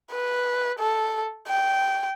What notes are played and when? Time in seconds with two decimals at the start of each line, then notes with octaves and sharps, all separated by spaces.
0.11 B4
0.79 A4
1.48 G5